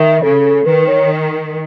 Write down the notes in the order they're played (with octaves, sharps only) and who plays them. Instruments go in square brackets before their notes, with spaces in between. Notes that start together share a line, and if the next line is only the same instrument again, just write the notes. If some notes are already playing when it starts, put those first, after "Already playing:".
Already playing: [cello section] D#3 [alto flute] E5
[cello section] C#3 [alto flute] A4
[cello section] D#3 [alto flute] B4
[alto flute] C#5